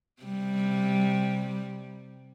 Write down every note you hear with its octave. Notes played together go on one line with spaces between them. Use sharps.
C3 G3